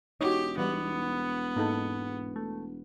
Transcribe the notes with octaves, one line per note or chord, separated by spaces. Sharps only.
E1 D#4 F#4 G4 C#5
E3 G3 B3
G#2 A#3 D#4 A4
A3